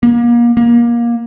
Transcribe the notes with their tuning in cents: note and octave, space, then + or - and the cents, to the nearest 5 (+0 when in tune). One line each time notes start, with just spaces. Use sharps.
A#3 +30
A#3 +20